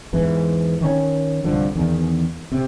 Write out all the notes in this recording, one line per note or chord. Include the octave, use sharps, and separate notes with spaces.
E2 G#2 E3
D#3 C#4
C2 G2 D3 F3
E2 D#3
C3